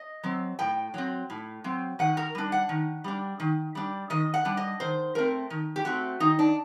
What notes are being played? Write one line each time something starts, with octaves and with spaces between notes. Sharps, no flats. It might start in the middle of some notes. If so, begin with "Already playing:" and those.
Already playing: D#5
F#3 C4
A2 G5
F#3 C4
A2
F#3 C4
D#3 F#5
A#4
G3 D4
F#5
D#3
G3 D4
D#3
G3 D4
D#3 D#5
F#5
G3 D4
D#5
D#3 C5
A3 C4 A#4
D#3
G4
A3 C4 F#4
D#3 D#4
D4